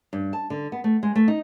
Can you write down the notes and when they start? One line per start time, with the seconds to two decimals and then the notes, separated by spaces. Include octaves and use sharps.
0.13 G2
0.33 A5
0.50 D3
0.72 B3
0.84 A3
1.03 G#3
1.15 A3
1.28 D#4